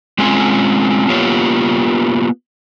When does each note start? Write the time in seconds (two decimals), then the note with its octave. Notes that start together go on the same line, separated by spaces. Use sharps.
0.18 G#3 C4 C#4 F4 G#5
1.10 A#3 B3 F4 G4 C#5